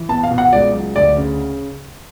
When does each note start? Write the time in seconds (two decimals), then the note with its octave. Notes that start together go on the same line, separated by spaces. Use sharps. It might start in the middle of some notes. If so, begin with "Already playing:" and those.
Already playing: E3
0.09 B3 A5
0.23 F5
0.31 B2
0.38 F#5
0.53 C#2 D5
0.73 F#3
0.96 D2 D5
1.17 C#3